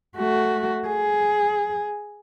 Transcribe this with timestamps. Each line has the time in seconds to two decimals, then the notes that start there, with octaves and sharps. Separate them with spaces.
0.17 A3 F#4
0.87 G#4